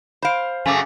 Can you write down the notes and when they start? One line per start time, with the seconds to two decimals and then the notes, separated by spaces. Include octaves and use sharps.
0.23 C5 F5 B5 D7
0.66 F#2 C#3 A3 G#5 D6